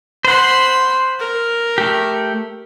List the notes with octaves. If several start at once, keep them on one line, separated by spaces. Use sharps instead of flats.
C5 F#5 B5 C6
A#4
A3 G4